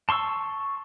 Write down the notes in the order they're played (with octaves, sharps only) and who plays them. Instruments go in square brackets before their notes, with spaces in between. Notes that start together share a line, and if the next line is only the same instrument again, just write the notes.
[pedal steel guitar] A5 C6 C#6 E6